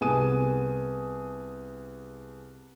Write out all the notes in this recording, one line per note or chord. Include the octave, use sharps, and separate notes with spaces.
C2 B3 G#4 G#5 D#6 D#7